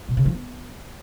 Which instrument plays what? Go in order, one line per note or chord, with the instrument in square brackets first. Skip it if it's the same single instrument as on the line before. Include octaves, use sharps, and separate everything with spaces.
[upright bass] B2
C#3
F3
B3